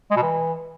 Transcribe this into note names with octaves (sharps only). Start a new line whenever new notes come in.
G#3
B2
E3